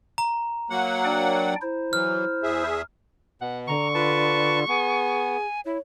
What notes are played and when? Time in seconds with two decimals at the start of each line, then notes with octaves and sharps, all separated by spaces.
0.18 A#5
0.70 F#3 A#3 F#5
1.05 D4 D5 G5
1.62 E4 C5
1.93 E3 F#3 F6
2.43 E2 G#4 E5
3.41 B2 F#5
3.68 D3 A#5 C#6
3.95 F4 B4 A5
4.68 B3 G#4 G#5
5.66 E4 C#5